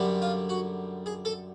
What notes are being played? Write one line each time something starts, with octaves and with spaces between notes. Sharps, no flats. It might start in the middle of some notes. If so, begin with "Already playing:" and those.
Already playing: F#2 D3 G3
F4
F#4
G#4
A4